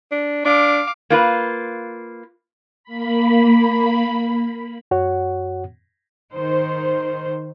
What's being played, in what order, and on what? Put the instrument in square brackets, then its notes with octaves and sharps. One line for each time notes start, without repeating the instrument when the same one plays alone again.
[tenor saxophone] D4
[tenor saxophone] D4 [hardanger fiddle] F5 D6
[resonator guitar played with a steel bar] A#3 F4 B4
[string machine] A#3 B5
[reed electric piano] F#2 F#4 C#5 F#5
[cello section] D#3 C5